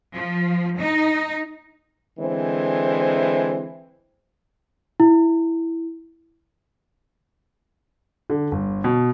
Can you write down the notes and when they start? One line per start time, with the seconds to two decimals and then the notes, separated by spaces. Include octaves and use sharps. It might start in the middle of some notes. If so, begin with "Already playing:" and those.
0.14 F3
0.79 D#4
2.19 D3 E3 G#3 C4 C5
5.00 E4
8.30 D3
8.52 G1
8.84 B2